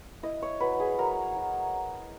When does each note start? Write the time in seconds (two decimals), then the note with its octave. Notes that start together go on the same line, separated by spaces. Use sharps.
0.23 E4 D#5
0.42 C#5
0.60 F#3 B4
0.80 G#4
0.99 F#3 A#4
1.36 F#3